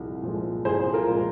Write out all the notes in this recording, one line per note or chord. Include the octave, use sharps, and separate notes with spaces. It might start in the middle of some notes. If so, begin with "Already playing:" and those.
Already playing: C2 A#2 F3 G#3
A#2 F3 G#3
C2 G#4 C5
F4 A#4
A#2 F3 G#3